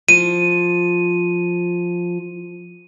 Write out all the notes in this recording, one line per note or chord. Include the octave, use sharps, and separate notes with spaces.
F3 D#7